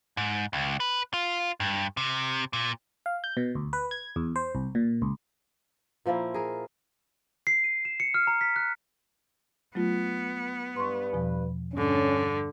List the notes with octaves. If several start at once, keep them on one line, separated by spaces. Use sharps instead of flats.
G#2
C#2
B4
F4
G2
C3
A#2
F5
G6
B2
D2
B4
G#6
E2
C5
C2
A#2
C#2
A#2 F3 A#3 E4
G#4 A#4
C7
D#7
E7
C#7
F6
A#5
B6
F#6
F#3 A3 B3 F4
G2 B4 C6 C#6
E2 B2 F3
G2 D3 C#4